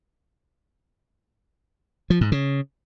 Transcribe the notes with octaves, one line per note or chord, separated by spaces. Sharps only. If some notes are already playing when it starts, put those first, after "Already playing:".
F3
G#2
C#3